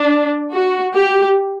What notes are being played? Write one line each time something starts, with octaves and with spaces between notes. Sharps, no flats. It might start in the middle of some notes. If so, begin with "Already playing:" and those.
Already playing: D4
F#4
G4